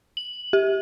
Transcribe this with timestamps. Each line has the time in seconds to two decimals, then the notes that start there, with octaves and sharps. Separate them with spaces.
0.17 F#7
0.53 G4